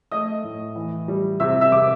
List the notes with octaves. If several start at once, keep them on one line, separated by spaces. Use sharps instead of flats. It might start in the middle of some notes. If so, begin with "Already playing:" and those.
A3 D#5 D#6
A2
E3
G3
C3 E5 E6
E5 E6
C3 D6